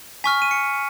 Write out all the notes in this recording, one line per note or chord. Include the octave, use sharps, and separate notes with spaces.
G#5 C#6 F6 B6
D#7
C#7